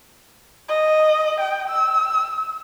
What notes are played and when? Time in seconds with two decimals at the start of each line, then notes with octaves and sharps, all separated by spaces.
0.69 D#5
1.40 G5
1.69 E6